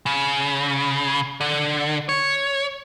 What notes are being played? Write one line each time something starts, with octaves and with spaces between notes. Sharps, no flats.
C#3
D3
C#5